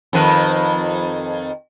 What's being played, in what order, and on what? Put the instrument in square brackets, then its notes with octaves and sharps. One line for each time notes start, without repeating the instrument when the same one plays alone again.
[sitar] F2 D#3 B4